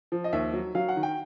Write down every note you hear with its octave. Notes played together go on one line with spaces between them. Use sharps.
F3
D#5
D#2 E5
F#3
F#3 F5
F#5
D#3
G5